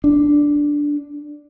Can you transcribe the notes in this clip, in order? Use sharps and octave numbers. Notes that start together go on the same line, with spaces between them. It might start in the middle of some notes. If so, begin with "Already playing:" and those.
D4